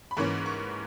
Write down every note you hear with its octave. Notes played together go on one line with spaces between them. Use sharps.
B5
G#2 E3 A#3 C#4 C#6
C#6